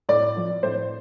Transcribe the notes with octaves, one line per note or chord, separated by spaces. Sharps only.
A2 D5
F3
A2 C5